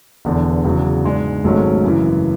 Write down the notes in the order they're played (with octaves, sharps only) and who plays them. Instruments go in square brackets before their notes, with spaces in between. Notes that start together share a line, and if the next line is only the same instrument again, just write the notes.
[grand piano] E1 E2 D3
E2 C#3 F#3
G#2 G#3 D4
G#1 G#2 F#3 A3 C#4
F#2 C#3 E3